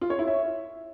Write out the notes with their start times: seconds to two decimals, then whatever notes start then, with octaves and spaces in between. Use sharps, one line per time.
0.01 F4
0.10 C#5
0.19 E4
0.28 E5